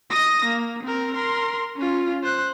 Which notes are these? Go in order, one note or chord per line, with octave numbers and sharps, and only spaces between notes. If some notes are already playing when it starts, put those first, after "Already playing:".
D#6 A#6
A#3
C4 A#4
A#4 C6
C#4 F4
C5 F#6